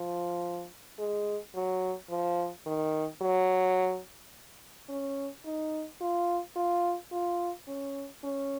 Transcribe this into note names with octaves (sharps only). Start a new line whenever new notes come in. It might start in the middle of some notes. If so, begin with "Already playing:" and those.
Already playing: F3
G#3
F#3
F3
D#3
F#3
C#4
D#4
F4
F4
F4
C#4
C#4